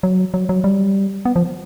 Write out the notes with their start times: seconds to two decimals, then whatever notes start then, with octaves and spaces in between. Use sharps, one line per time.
0.03 F#3
0.34 F#3
0.49 F#3
0.64 G3
1.25 B3
1.36 F3